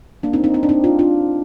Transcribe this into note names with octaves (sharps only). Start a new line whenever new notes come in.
A#3 D4
C4 D#4
C4 D#4
C4 D#4
D4
C4 D#4
D4 F4
D4 F4